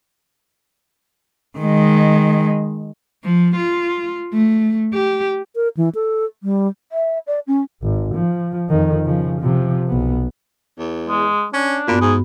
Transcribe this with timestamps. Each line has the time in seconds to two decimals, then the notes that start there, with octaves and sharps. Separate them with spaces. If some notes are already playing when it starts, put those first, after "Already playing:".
1.58 D#3 G#3
3.24 F3
3.56 F4
4.33 A3
4.94 G4
5.56 A#4
5.77 E3
5.95 A4
6.43 G3
6.92 E5
7.27 D5
7.47 C#4
7.83 G#1
8.15 F3
8.69 F2 D#3
9.05 C#3 F3
9.40 C3 F3
9.88 B1 B3
10.78 E2
11.09 G#3
11.54 C#4 D4
11.87 G2 A#2 B3 F#4
12.01 G#2 G#4